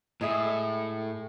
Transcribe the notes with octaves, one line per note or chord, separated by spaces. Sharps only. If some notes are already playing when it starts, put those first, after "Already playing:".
A2 G#3 G#4 E5